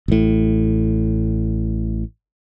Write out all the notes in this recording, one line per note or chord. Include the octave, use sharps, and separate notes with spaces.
A1 A2